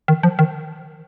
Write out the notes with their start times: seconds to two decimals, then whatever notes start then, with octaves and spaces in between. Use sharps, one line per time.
0.08 D#3
0.23 F3
0.39 D#3